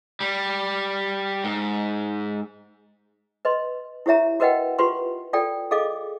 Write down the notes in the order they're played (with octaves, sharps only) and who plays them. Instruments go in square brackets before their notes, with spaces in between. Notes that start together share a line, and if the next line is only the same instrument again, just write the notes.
[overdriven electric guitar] G3
G#2
[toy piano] B4 D#5 C6
E4 G4 C#5 E5 A#5
F#4 A#4 B4 D#5 F#5 G5
F4 G4 B4 C6
F4 A4 D5 G5
G#4 A4 D#5 F5 D6